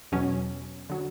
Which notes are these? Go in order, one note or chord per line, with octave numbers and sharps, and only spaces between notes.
E2 B2 F#3 C#4
D3 F#3